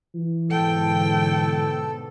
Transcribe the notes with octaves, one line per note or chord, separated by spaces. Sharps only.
E3
G#2 B2 D3 A4 G5